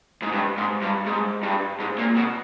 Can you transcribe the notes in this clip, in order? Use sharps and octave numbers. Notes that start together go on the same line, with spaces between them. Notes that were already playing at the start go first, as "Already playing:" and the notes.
G#2
G2
G#2
G2
G#2
G2
G#2
A#2
B2